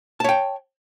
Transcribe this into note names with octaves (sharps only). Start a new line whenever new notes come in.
C#5 G5 A5